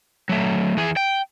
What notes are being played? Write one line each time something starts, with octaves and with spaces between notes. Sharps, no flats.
F#3 A3
E3 G#4
G5